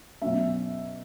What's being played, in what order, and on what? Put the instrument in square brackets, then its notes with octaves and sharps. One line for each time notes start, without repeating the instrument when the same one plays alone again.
[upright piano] B2 F#3 C#4 E5